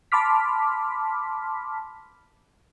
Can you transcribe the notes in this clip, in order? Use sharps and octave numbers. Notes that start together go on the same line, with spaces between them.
A5 B5 C6 D6 F6 B6